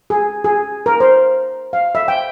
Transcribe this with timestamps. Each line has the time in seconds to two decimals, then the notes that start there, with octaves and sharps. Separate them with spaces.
0.10 G#4
0.44 G#4
0.86 A#4
1.00 C5
1.73 F5
1.95 E5
2.08 G5